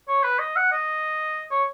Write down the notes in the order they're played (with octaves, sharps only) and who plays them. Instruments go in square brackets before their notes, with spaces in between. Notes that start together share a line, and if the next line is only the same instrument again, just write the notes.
[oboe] C#5
B4
D#5
F#5
D#5
C#5